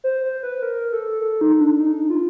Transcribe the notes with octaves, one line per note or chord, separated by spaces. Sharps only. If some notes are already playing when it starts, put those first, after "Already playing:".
C5
C5
B4
A#4
A4
A4
D#4
D4
D#4
F4